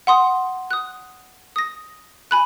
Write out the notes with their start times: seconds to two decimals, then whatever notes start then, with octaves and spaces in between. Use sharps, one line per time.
0.07 F#5 C6 D#6
0.71 D#6 F#6
1.56 D#6 A#6
2.31 G#5 B5 F#6